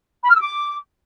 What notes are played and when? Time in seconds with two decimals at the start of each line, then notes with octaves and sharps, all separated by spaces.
0.24 B5
0.30 F6
0.35 E6
0.41 D6